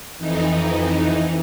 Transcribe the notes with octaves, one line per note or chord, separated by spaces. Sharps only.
F2 E3 D#4